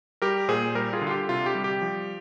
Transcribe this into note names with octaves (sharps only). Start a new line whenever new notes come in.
G3 G4 A#4
A#2 G#4 C5
G3 G4 A#4
F4 G#4
D3
F4
G4
C3 F4
G4
G3
G4
F3